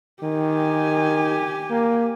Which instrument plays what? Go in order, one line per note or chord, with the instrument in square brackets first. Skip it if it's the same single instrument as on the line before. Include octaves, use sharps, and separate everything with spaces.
[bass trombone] D#3 [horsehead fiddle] G4 G#5
[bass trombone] A#3